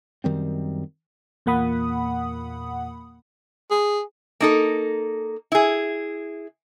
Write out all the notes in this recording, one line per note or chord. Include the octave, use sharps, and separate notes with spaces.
F#2 D#3 G3 C4
E2 A#2 A#3 F#5 B5 D#6
G#4
A#3 D#4 A4
E4 G#4